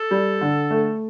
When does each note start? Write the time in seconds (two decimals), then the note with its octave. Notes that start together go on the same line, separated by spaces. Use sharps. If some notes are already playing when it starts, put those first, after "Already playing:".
Already playing: A4
0.11 G3
0.41 D3
0.71 A3